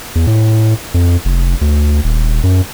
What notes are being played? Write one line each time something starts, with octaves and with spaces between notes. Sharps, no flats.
E2
A2
F2
F1
D2
D#1
F#2